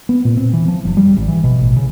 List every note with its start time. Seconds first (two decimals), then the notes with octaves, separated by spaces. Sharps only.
0.09 B3
0.25 A#2
0.37 C4
0.53 E3
0.68 F3
0.85 F#1
0.97 G3
1.17 G#1
1.28 E3
1.44 B2
1.61 A1
1.77 C#3